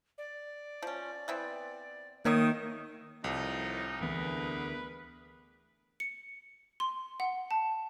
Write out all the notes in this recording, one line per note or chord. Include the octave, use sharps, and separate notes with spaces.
D5
F3 C#4
E3 B3 C4
D#3 A#3 C#5 E5 C#6 D#6
C2 A2 D#3 F3 D#4
D2 D3 E3 B3 G#4 A#4 B4
C#7
C6
F#5
A5